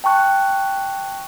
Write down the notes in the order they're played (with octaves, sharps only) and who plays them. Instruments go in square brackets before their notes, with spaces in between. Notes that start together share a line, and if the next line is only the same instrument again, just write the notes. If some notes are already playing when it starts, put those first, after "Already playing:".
[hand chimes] G5 A5 C#6 F#6